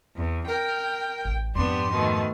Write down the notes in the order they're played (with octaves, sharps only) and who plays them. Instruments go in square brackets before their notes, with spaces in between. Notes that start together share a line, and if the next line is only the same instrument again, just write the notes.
[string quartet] E2
[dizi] A#4 [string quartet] G5
[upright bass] A1
[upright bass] F2 G#2 [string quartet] B3 D4 G4 [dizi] C6
[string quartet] B2 D#3 A3